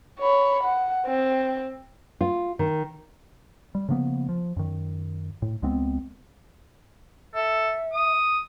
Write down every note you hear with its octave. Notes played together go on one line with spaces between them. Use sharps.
C#5 B5
F#5
C4
F4
D#3
G3
C#3 F3 A#3 B3
F3
F#2 D#3
A2
C#2 G#3 B3 C4
A4 E5
D#6